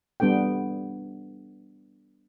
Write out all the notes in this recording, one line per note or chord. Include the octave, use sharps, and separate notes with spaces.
G3 B3 D4 A4 G5